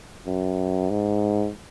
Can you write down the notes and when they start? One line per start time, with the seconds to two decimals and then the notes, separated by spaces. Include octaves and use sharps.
0.27 F#2
0.90 G#2